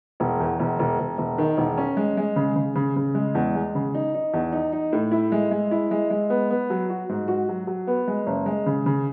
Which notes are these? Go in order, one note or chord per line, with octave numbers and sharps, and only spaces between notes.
E1
E2
E1
E1
E1
E1
D#3
E1
C#4
G#3
G#3
C#3
C#3
C#3
C#3
G#3
E2
G#3
C#3
D#4
D#4
E2
D#4
D#4
A2
E4
G#3
G#3
E4
G#3
G#3
B3
B3
F#3
F#4
G#2
F#4
F#3
F#3
B3
G#3
F#1
G#3
C#3
C#3